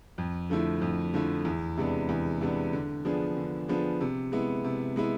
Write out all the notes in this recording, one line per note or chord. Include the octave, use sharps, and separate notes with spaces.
F2
D3 F3 A3 E4
F2
D3 F3 A3 E4
E2
C3 G#3 B3 D4
E2
C3 G#3 B3 D4
D3
F3 B3 D4 G#4
D3
F3 B3 D4 G#4
C3
G#3 B3 E4
C3
G#3 B3 E4